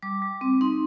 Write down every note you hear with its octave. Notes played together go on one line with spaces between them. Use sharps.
G3 D6
G3
C4
D#4 C6